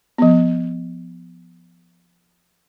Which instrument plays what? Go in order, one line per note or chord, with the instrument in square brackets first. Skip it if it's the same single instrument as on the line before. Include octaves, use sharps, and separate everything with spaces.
[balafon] F3 B3